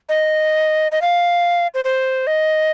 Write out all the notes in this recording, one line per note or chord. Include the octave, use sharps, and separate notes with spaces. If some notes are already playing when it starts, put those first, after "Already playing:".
D#5
D#5
F5
C5
C5
D#5